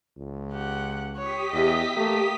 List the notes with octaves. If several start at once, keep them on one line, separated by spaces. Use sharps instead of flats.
C#2
G4 F#5
G4 C#5 D#6 B6
E2 D#5 E5
A3 A#3